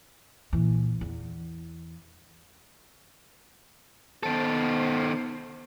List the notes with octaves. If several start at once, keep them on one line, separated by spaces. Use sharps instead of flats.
A#2 E3
E2
D#3 B3 A4 C5